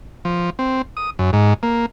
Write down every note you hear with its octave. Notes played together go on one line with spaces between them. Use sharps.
F3
C4
D#6
F#2
G#2
A#3